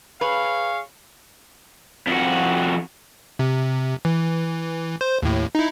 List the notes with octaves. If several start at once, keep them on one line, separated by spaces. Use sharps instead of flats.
G#4 B4 C#5 F5
F2 F#4
C3
E3
C5
D#2 A2
D#4 E4